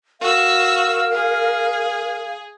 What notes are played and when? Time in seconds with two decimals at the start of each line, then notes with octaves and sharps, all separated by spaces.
0.21 F#4 A#4 F5 E6
1.12 G#4